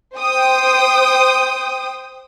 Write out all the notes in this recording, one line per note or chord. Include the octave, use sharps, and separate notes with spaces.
C5 G5 D#6